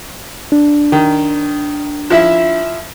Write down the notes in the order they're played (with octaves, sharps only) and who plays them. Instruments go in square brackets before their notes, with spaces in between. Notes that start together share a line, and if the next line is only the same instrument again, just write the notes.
[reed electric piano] D4
[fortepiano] D#3
F3 E4 E5